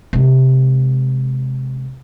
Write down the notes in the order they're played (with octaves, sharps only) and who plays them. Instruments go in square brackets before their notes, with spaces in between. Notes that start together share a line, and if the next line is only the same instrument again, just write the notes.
[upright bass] C3 G#3